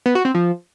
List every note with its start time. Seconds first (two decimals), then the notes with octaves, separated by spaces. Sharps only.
0.06 B3
0.15 F#4
0.25 C4
0.34 F3